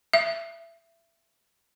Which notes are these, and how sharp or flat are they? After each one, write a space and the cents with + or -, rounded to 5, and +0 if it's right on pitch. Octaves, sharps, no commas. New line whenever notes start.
E5 +25